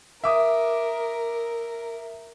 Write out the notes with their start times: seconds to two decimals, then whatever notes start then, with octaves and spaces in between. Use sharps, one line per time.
0.24 A#4 E5 D6 D#6